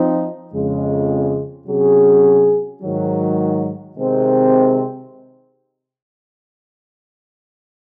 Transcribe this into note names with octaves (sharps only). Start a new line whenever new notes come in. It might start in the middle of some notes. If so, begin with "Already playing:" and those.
Already playing: F3 C4 D#4
F2 C#3 G#3
C3 F#3 C#4 G#4
G#2 D#3 F#3
C3 D#3 G#3 C4